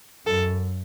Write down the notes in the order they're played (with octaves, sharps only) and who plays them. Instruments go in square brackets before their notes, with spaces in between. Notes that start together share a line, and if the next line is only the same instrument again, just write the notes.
[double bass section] F#2 [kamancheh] A4